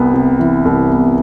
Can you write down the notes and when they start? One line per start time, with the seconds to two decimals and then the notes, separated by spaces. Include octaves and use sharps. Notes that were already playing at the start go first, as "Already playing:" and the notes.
Already playing: C2 B3
0.14 C3
0.39 E3
0.65 C2
0.90 B3